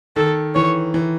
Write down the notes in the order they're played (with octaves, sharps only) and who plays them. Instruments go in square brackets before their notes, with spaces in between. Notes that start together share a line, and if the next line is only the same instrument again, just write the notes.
[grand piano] D#3 [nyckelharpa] A4
[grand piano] E3 [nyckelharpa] C#5
[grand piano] E3